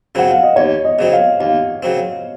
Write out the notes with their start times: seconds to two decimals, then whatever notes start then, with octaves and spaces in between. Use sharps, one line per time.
0.15 C#3 F#3 C4 F#5
0.30 F5
0.43 D#5
0.56 D#2 C#5
0.84 D#5
0.99 C#3 F#3 C4 D#5
1.13 F5
1.40 D#2 F5
1.83 C#3 F#3 C4